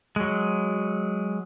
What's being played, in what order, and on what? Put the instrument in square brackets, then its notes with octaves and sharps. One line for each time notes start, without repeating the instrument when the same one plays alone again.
[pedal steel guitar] F#3 G#3